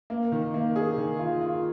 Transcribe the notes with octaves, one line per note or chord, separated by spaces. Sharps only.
A#3
D#3
A#3
G#4
D#3
F4
F4